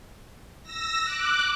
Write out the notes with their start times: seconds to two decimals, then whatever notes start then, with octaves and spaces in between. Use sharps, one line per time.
0.63 E6 A#6
1.03 D6 F#6